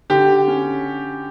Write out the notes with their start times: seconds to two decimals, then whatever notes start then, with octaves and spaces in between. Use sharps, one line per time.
0.10 D3 G4
0.48 C#4